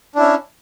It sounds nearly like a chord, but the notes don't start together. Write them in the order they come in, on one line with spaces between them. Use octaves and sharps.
D4 E4 C#4